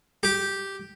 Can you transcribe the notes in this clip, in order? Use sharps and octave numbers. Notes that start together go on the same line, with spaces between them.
G4